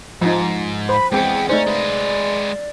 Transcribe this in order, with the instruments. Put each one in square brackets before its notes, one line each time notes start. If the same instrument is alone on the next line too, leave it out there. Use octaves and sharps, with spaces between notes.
[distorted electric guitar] G#2 [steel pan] F3 D#4
[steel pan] C5 [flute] B5
[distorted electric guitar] E2 B3 [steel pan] G#3 C4 G#4 [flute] G5
[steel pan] A3 D#4 C5 [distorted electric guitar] C#4 [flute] D5
[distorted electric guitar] G#3 B4